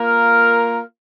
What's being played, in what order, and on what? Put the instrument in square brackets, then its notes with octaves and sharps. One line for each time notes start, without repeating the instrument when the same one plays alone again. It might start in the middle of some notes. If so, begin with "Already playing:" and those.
Already playing: [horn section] A#3 F4 A#4